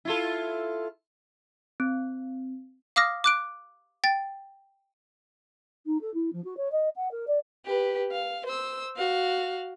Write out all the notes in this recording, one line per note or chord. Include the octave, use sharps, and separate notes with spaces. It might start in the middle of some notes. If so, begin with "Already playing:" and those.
E4 F4 A4
C4
F5 D6 D#6 F6 A#6
D6 F#6 D7
G5 A6
D#4
A4
E4
F3
F#4
C#5
D#5
F#5
A#4
D5
G4 B4
F5
C5 E6
F#4 F5